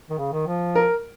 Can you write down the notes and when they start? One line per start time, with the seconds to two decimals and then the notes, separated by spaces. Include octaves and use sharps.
0.10 D#3
0.18 C#3
0.32 D#3
0.47 F3
0.75 A#4